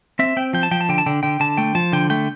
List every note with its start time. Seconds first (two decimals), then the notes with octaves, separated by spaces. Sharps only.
0.19 C4 E5
0.37 C4 G5
0.53 F3 G5
0.63 A5
0.71 F3 G5
0.81 A5
0.89 D3 G5
0.98 A5
1.06 D3 G5
1.23 D3 G5
1.40 D3 A5
1.57 A3 G5
1.75 F3 A5
1.93 D3 G5
2.10 A3 G5